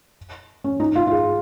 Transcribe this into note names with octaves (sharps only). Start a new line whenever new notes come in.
C#4
D#4
F4
F4
G#4